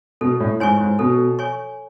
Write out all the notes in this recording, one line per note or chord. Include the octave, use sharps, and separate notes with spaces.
B2 A4
A2
G#2 C#5 G#5 C#6
G#2
B2 A4
C#5 G#5 C#6